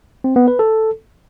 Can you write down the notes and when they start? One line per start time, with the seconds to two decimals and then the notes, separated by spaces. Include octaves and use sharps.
0.24 C4
0.36 B3
0.48 B4
0.59 A4